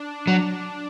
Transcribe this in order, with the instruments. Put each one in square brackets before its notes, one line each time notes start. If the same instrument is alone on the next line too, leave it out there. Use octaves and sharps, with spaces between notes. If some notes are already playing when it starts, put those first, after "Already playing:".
Already playing: [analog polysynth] D4
[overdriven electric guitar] F#3